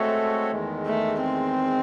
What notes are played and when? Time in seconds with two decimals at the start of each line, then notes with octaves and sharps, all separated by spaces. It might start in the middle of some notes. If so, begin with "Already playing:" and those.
Already playing: G#3 A3 C4 F#4 A4 C#5
0.51 E2 D#3 G#3
0.86 A3
1.22 C4